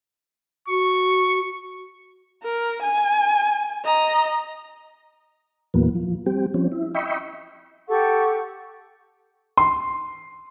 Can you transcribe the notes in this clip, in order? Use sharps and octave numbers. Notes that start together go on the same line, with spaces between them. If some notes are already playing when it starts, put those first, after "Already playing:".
F#4 C#6
A#4
G#5
D#5 A#5
E2 A#2 E3 F#3 A#3 B3
F3
G3 C4 G4
F3 C4 C#4
E4
D#5 E5 G5 B5 C#6
G4 A4 F#5 C#6
C6